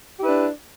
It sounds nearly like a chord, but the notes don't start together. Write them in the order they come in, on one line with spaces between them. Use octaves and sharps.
G4 E4 B4 D4